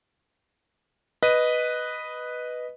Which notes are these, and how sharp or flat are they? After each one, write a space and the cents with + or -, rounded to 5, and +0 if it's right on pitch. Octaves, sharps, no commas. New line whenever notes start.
B4 +0 D#5 +0